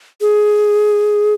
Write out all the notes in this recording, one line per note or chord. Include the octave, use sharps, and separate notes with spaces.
G#4